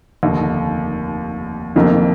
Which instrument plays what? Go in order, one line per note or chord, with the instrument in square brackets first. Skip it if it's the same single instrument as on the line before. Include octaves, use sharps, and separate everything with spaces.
[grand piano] F1 D#2 D3
F#1 F2 D#3 A#3